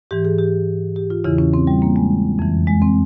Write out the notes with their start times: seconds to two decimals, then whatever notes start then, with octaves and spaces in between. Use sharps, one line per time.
0.11 G#2 E3 G4
0.25 G#4
0.38 G4
0.96 G4
1.10 F4
1.24 E2 C#3 E3 E4
1.38 C#4
1.54 C4
1.67 G3
1.82 A#3
1.96 G#3
2.39 F2 E3
2.67 G#3
2.82 C4